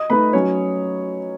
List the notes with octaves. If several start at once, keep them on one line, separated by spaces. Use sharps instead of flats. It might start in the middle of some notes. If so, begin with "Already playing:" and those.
Already playing: D#5 D#6
A3 D#4 B4 B5
F#3 C#4 C#5